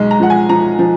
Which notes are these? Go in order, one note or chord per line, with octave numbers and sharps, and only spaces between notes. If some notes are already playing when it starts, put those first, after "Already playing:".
Already playing: B1 G#3
A#5
F3 F#5
G#5
F3 A#5
F3